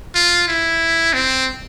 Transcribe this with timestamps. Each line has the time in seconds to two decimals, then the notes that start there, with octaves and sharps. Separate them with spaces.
0.15 F4
0.48 E4
1.14 C4